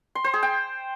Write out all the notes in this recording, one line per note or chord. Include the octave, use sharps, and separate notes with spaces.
C6
C5
G#4
G5